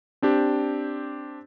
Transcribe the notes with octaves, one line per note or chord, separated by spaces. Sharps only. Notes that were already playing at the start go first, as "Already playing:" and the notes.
C4 D4 G4